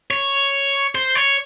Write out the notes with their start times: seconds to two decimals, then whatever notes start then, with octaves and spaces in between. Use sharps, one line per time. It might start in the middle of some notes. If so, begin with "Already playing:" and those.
0.11 C#5
0.95 C5
1.15 C#5